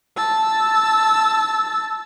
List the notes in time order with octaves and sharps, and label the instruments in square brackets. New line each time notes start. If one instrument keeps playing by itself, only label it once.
[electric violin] A5 E6